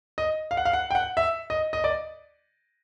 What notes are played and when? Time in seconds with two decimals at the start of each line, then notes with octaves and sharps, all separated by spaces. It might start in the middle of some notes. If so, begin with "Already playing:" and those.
0.18 D#5
0.51 F5
0.57 F#5
0.65 F5
0.73 F#5
0.91 G5
0.95 F#5
1.17 E5
1.50 D#5
1.73 D#5
1.84 D5